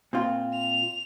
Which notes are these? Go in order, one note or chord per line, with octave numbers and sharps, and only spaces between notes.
A#2 C4 F4
F7